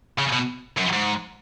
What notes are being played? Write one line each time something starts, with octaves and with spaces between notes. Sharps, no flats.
C#3
B2
F#2
G#2